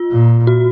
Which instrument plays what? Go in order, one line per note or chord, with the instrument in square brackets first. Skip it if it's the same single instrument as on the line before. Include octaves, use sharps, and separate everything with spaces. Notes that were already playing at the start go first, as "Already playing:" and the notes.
Already playing: [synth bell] F4
[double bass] A#2
[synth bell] F#4